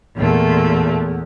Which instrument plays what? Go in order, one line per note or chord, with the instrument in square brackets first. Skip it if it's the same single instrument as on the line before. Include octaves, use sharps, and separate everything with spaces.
[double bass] E2 [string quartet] A#2 A3